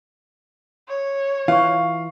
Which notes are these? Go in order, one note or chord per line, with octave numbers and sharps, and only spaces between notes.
C#5
E3 F4 C5 F5 C#6